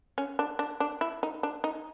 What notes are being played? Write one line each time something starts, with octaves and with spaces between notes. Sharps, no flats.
C#4
D4
D4
D4
E4
D#4
D4
D#4